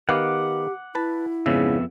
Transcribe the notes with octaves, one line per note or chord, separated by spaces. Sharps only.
D#3 B3 G4 F5 F#5 D6
E4 B4 A5
F2 G#2 C#3 B3 E5